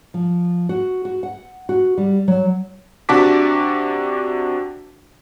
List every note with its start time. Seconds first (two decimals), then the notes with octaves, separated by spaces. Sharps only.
0.14 F3
0.69 F#4
1.05 F#4
1.23 F#5
1.69 F#4
1.98 G3
2.28 F#3
3.09 C3 D4 F#4 A5 D6 B6